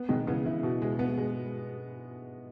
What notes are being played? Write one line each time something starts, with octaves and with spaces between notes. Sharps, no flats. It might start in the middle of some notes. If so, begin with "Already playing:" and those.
Already playing: B3
B2 D#3 G#3
C#3 E3 B3
C#3 E3 E4
B2
G#3
B3
G#3